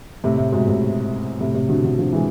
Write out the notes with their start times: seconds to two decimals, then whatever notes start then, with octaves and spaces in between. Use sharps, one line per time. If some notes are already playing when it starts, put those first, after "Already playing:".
0.24 A2 C3
0.38 A2
0.52 G#2 B2
0.68 A2 C3
1.41 A2 C3
1.54 A2 C3
1.69 B2 D3
1.84 B2 D3
1.99 D3 F3
2.13 E3 G#3